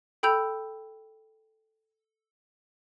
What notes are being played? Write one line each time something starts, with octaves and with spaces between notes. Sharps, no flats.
A4 G5 B5 E6 G6 F7